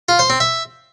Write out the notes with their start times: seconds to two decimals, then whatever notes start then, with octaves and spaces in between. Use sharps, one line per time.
0.09 F4
0.19 C5
0.30 C4
0.40 E5